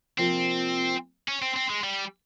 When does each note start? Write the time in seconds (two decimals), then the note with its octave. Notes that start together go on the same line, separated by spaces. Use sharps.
0.18 C3 F3 A#3 C4 F4
1.28 C#4
1.42 C4
1.56 C4
1.70 G#3
1.84 G3